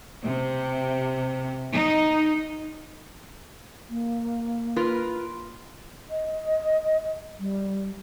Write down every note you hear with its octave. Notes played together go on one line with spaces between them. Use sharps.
C3
D#4
A#3
F4 A#4 B4
D#5
G3